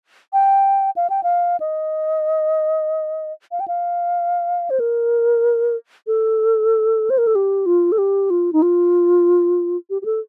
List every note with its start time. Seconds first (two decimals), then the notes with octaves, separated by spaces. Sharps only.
0.33 G5
0.96 F5
1.10 G5
1.23 F5
1.60 D#5
3.52 F5
3.60 G5
3.68 F5
4.70 C5
4.80 A#4
6.07 A4
7.10 C5
7.18 A#4
7.27 A4
7.35 G4
7.66 F4
7.92 A4
7.98 G4
8.30 F4
8.53 D#4
8.62 F4
9.90 G4
10.02 G4
10.05 A4